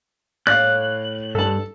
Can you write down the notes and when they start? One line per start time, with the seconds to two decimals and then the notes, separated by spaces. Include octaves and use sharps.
0.47 A2 D5 F5 F#6
1.35 G2 A4 A5